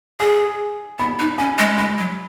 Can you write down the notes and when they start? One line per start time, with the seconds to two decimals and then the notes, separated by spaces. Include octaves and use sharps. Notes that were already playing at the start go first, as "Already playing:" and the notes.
0.20 G#4 G#5
0.99 B3 B5
1.19 D#4
1.38 C#4 G#5
1.58 G#3
1.78 G#3 B5
1.98 F#3